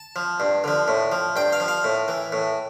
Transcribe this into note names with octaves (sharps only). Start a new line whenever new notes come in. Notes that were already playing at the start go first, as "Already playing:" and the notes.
Already playing: A5
F3
G2
D3 F3
A2
F3
G2 G5
F5
F3
F5
A2
E3
A2